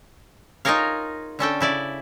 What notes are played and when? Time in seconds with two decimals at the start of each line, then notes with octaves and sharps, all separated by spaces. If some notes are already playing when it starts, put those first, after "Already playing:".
0.65 D#4 F4 G#4 A#4 C#5 F5
1.39 D3 C#4 A4 G5
1.61 C#3 E4 D5